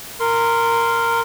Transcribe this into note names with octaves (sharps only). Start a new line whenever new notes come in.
A#4 C6